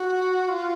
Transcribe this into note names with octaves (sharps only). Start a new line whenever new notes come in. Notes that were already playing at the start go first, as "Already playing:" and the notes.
Already playing: F#4
F4